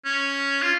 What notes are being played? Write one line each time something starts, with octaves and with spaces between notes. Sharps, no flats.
C#4
F4